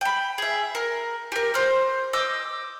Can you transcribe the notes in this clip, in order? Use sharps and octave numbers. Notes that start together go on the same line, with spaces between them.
G5 B5
G#4 E5
A#4
G4 A#4
C5 F6
D#5 D6 E6 G6